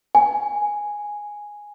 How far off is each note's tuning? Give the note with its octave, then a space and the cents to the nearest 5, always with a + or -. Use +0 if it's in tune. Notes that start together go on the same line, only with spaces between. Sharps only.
G#5 +0